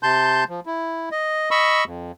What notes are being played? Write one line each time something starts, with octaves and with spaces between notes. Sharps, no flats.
C3 A5 C6 G6
F3
E4
D#5
D#5 B5 C#6 E6
F2